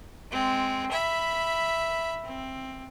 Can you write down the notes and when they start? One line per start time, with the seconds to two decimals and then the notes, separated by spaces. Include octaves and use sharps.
0.31 G#3 C4
0.91 E5 B5
2.24 C4